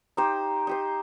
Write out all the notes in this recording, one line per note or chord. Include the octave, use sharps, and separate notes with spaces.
D#4 G4 C5
D#4 G4 C5